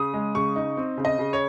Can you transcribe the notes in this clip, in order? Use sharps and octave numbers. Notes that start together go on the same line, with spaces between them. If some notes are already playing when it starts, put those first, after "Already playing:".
Already playing: C#3 D#6
G#3
C#3 C#6
D#4
C4
C#3
D#5
C#3
C#5